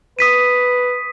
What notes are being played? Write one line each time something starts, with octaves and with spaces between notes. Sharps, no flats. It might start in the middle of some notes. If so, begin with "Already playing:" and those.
B4 D#6 B6 D#7